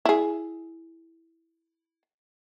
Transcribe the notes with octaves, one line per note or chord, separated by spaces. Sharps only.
E4 G#4